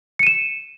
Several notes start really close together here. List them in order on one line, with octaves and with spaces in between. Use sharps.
C#7 D#7 E7